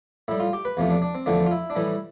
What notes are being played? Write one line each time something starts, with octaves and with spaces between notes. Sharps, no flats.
A2 G3 E4
F4
G4
B4
E2 C3 F3 A3
D4
D4
C4
E2 D3 F3 A3 D4
F4
E4
D4
A2 E3 G3 E4